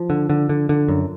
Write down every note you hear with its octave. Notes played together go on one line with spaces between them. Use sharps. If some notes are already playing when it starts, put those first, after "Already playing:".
Already playing: F3
D3
D3
D3
D3
F#2